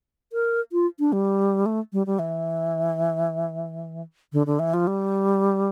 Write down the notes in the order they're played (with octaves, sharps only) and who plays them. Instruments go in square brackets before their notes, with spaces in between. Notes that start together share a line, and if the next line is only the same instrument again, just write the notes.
[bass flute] A#4
F4
D4
G3
A3
G3
G3
E3
D3
D3
E3
F3
G3